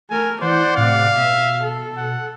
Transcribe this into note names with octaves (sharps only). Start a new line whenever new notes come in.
A3 A#4 G#5
E3 C5 D5 F#5 G6
A2 C3 F5
B2 E5
A4
F#5